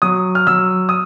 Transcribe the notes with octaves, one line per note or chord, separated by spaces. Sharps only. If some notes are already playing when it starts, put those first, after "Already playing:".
F#3 D#6
F6
F#3 E6
D#6